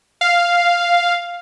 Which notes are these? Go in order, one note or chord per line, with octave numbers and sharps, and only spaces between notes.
F5